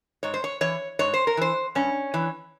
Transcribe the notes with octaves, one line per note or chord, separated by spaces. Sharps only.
G#2 C#5
C5
C#5
E3 C#5
G#2 C#5
C5
A#4
E3 C5
G2 C#4
E3